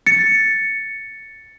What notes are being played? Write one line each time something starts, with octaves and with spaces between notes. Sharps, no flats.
A6 C#7